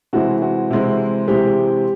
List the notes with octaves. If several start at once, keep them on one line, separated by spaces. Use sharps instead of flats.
C3 E3 G#3 C4 F#4
F#4
C3 E3 G#3 C4
C3 E3 G#3 C4 G4